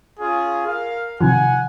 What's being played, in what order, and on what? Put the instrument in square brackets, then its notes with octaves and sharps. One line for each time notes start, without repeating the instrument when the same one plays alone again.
[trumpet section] C#4 F4 G#4
A#4 F5
[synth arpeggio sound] C3 D#3 F3 [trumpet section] F#5 G#5